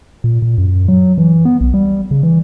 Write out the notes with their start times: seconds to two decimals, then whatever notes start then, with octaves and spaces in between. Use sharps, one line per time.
0.24 A#2
0.42 A#2
0.58 F#2
0.88 F#3
1.18 E3
1.45 B3
1.61 B1
1.74 G3
2.11 C#3
2.23 E3